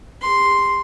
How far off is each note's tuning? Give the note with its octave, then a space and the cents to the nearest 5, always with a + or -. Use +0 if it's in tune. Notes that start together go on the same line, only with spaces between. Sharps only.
G4 +40 C6 +0